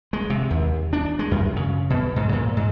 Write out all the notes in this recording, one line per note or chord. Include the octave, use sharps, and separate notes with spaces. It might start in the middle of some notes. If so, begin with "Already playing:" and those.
G#3
C3
D#2
D4
G#3
F#2
C#3
B2
G#2
A#2
G#2